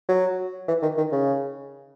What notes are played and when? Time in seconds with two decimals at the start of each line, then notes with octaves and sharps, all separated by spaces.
0.08 F#3
0.68 E3
0.82 D#3
0.97 D#3
1.12 C#3